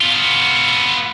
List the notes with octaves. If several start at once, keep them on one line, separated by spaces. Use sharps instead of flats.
B3 F4